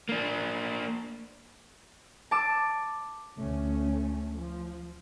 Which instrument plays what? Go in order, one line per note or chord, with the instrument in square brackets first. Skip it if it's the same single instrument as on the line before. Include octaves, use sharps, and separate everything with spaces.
[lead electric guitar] A#3 D4
[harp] A5 D6 E6
[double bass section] D2 A3 C#4
F3